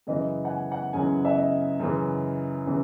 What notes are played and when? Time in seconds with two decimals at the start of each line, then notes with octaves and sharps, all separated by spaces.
0.07 F#2 C#3 E3 D#5
0.45 F#5
0.50 G#5
0.72 F#5
0.93 F#2 C#3 E3 G#5
1.25 E5
1.36 D#5
1.79 F#2 C#3 E3
2.66 C#3 E3